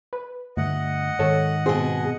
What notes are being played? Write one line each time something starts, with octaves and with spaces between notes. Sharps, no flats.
B4
G2 D3 A3 D#5 F#5
G#2 D#3 A4 C#5
B2 C4 G#4